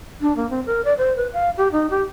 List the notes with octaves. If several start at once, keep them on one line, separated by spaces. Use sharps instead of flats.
D4
A#3
C4
A#4
D5
C5
B4
F5
G4
D#4
G4